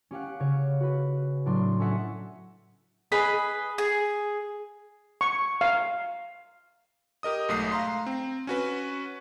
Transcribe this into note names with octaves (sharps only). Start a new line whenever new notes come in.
C#4 G4 F5 F#5
C#3 C#5
F#4 B4
A2 F#3 D4 C6
C#4 A4 D#5 E5 F#5
G#4 B4 D#5 B5
G#4
C#6
F5
G4 A#4 D#5 D#6
B1 G#2 A3 D#6 C7
F5 A#5 C6
C4
C#4 F#4 B4